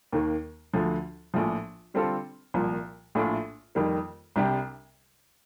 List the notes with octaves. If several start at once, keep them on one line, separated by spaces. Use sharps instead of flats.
D#2 D#3 A#3
D2 D3 F3
A#1 A2 F3
D3 G3 C4 F4 A4
C2 A#2 F3
A#1 A2 A3 D4 F4
F2 D#3 G3 A#3
C2 C3 G3 D4 G4